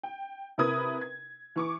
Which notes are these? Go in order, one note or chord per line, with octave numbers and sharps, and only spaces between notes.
G5
C3 E4 A#4 B4 D#6 G#6
G#6
E3 C#6 D6